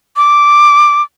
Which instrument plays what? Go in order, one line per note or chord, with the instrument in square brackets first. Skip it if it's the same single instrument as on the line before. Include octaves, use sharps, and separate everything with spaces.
[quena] D6